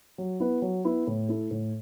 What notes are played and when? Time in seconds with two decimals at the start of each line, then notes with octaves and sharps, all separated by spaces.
0.18 F#3
0.40 B3 E4 B4
0.62 F#3
0.84 B3 E4 B4
1.07 A2
1.29 A3 E4 A4
1.51 A2